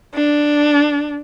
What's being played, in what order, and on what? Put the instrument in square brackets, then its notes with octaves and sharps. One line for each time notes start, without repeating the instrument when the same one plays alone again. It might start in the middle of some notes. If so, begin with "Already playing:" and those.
[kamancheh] D4